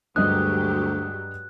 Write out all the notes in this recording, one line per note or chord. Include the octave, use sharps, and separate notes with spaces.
D2 G2 F#3 G#3 G4 D#5 D#6 F#6